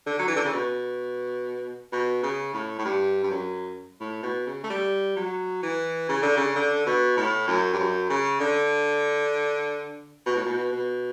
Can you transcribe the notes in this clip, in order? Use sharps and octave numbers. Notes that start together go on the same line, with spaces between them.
D3
F#3
E3
D3
C#3
B2
B2
C#3
A2
A2
G2
G2
F#2
A2
B2
C#3
A3
G3
F#3
E3
C#3
D3
C#3
D3
B2
A2
F#2
G2
F#2
C#3
D3
B2
A2
B2
B2